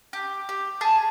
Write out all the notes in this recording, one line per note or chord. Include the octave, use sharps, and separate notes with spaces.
G4
G4
G#4 A5